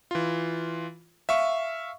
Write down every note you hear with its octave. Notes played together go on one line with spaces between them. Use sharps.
E3 F4
E5 F5 C#6